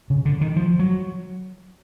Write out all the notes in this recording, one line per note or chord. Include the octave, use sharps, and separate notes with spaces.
C#3
D3
D#3
F3
F#3